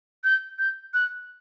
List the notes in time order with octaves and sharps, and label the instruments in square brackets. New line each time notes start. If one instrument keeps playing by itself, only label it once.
[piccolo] G6
G6
F#6